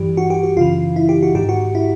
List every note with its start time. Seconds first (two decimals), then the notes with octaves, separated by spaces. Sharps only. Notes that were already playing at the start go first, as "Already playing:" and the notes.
Already playing: G2 E3 G4
0.17 F#4
0.30 G4
0.43 F#4
0.57 F#2 C#3 E3 F4
0.96 E4
1.09 G4
1.23 F#4
1.35 G#2 D#3 G4
1.49 F#4
1.75 E4